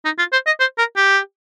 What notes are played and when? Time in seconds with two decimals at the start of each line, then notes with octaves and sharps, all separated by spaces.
0.05 D#4
0.19 F4
0.32 C5
0.46 D#5
0.60 C5
0.78 A#4
0.96 G4